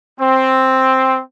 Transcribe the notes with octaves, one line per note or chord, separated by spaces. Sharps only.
C4